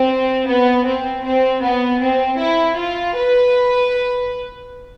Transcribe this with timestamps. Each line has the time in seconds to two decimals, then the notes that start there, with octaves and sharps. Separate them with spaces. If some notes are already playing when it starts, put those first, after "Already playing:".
Already playing: C4
0.48 B3
0.87 C4
1.25 C4
1.63 B3
2.02 C4
2.40 E4
2.78 F4
3.16 B4